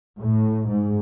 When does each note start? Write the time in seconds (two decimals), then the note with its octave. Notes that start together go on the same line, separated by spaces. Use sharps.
0.18 A2
0.69 G#2